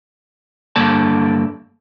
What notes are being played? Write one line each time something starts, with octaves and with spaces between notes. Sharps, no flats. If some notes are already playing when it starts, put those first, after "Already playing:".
G2 D3 A#3 A4 D5 A5